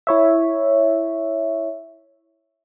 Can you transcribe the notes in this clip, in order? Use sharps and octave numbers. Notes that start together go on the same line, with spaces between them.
E4 C#5 E5